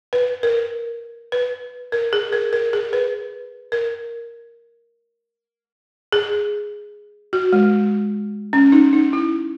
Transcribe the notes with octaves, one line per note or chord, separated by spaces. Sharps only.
B4
A#4
B4
A#4
G#4
A#4
A#4
G#4
B4
A#4
G#4
F#4
G#3
C#4
D#4
D#4
E4